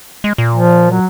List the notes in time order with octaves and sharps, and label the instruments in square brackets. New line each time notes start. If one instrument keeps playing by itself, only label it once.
[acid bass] G#3
A#2
[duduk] F3
F#3